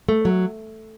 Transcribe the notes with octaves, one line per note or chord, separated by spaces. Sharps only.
A3
F#3